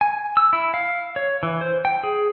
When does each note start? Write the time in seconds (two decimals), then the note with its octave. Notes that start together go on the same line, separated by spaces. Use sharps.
0.01 G#5
0.37 E6
0.53 E4
0.74 F5
1.16 C#5
1.43 E3
1.61 C5
1.85 G5
2.03 G#4